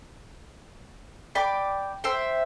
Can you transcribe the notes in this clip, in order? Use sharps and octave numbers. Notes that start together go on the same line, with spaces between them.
D5 G5 B5 D6
C5 E5 G5